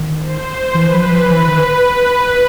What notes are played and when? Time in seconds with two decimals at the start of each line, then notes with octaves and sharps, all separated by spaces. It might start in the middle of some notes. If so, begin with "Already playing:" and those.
Already playing: D#3
0.19 C5
0.74 E3 B4
0.93 F3
1.12 F3
1.30 E3 B4
1.48 D#3
1.85 B4